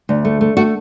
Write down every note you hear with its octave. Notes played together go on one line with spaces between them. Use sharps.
D2
A3
A3
A3 F#4